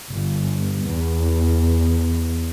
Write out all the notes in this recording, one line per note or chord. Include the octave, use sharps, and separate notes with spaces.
G1
E2